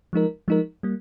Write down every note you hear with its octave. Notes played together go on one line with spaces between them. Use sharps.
F3 G#3 D#4 A#4
F3 G#3 D#4 A#4
G3 A#3